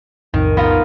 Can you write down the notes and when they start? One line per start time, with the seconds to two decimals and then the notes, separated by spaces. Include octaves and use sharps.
0.34 B1 F2 A2 D#3
0.57 B3 F4 A#4